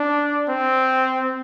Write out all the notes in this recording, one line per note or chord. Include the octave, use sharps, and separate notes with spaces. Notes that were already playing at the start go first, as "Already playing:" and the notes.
Already playing: D4
C4